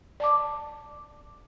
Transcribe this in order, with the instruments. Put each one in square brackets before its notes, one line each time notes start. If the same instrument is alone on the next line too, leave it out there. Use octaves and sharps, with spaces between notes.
[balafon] D5 A5 D6